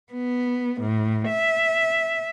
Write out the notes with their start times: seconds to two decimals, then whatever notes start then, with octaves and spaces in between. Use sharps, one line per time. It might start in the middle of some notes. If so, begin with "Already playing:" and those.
0.12 B3
0.80 A2
1.28 E5